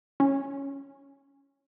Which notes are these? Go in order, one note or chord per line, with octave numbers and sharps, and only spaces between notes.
C#4